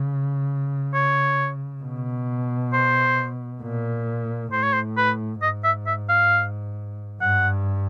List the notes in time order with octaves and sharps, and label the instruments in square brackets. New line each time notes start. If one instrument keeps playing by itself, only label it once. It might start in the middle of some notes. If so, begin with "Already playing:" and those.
Already playing: [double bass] C#3
[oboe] C#5
[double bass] B2
[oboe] C5
[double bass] A#2
[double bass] A2 [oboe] C5
[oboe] C#5
C5
B4
[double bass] G#2 [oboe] D#5
[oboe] E5
E5
F5
[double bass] G2 [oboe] F#5